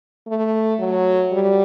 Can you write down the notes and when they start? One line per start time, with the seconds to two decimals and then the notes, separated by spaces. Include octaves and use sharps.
0.27 A3
0.80 F#3
1.32 G3